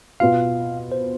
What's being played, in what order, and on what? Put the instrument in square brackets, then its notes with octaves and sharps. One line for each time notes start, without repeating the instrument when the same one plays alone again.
[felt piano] B2 B3 F4 [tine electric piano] F5
[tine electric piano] C5